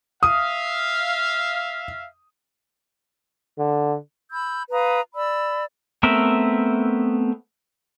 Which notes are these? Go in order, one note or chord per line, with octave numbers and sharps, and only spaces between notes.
E5 F5 D#6
D3
B5 E6 G6
B4 F5 A#5 D#6
D5 B5 E6
A3 B3 C4 A#4 E5